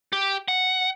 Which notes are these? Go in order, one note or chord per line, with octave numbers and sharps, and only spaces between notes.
G4
F#5